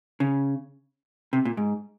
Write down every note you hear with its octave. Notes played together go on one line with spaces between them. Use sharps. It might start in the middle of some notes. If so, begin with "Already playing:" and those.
C#3
C3
A#2
G#2